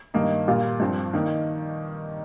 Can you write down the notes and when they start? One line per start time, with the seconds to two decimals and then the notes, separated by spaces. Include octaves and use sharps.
0.14 G2 D#3 A#3 D#4
0.47 A#2 G3 A#3 F4
0.80 G2 F3 C4
1.13 D#3 A#3 D#4